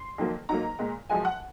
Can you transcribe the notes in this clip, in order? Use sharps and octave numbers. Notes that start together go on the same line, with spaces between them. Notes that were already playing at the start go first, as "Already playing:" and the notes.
Already playing: C6
F2 D#3 F#3 A#3
G#2 F#3 A#3 A#5
A#2 G#3
F#2 F3 G#3 G#5
F#5